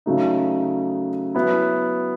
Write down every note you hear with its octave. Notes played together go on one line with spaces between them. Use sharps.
C#3 F#3 A3 D#4
F#3 B3 E4